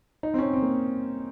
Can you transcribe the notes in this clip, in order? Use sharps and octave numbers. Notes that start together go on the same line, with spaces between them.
D#4
C4
C#4
C4
A#3